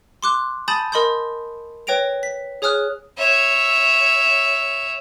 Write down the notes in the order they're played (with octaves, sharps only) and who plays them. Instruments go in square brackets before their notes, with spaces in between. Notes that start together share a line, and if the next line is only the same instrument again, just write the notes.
[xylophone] C6 D6 F#6
G#5 A5 B5 D#6 G6 A6
A#4 D#5 B5 C6 D#6 G6
B4 C#5 G5 A#6 D7 F7
B6
G#4 C#5 G#5 D#6 F6 F#6
[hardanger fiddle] C#5 E5